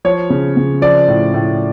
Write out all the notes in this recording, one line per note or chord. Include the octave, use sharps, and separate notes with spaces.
F3 C#5
C#3
C#3
F3 D5
A2
A2